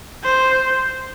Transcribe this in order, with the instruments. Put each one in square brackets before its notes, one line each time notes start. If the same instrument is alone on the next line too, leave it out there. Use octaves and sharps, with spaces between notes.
[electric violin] C5